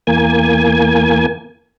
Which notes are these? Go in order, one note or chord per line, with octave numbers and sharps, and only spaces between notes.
E2 A#3 G#5